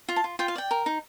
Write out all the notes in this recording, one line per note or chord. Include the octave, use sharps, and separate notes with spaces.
F4
A5
F4
F4 G5
F5
D5 G5
A#4
D#4